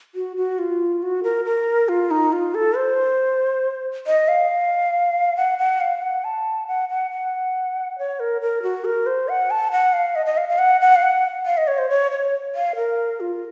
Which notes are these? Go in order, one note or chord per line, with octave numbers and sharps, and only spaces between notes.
F#4
F#4
F4
F#4
A#4
A#4
F4
D#4
F4
A4
C5
D#5
F5
F#5
F#5
F5
F#5
A5
F#5
F#5
F#5
C#5
A#4
A#4
F#4
A#4
C5
F#5
A5
F#5
F5
D#5
D#5
F5
F5
F#5
F#5
F5
F#5
F5
D#5
C#5
C5
C#5
C#5
F5
A#4
F4